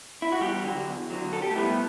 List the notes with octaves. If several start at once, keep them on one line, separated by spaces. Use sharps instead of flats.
E4
F#4
E2 G3 G4
D3 F#3
E2
D3 F#3
B1 A4
G4
A2 G3 A3 B3 E4 A4